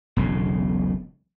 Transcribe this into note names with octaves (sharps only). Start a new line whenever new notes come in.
E1 B1 A2 C#3